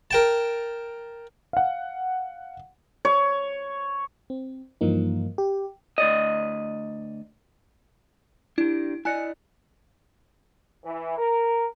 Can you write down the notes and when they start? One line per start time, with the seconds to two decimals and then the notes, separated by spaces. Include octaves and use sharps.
0.11 A#4 G5 A5
1.53 F5 F#5
3.05 C#5
4.30 C4
4.81 G2 E3 F3 A#3 D#4
5.38 G4
5.98 D2 D5 D#5
8.58 D4 E4 G4
9.05 E4 D5 D#5 G#5 F#6 C#7
10.84 E3
11.17 A#4